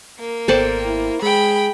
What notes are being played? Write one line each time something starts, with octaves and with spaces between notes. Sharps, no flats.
A#3
G#1 B3 A4 C5 D5 G5
E4
G#3 G#4 G5 B5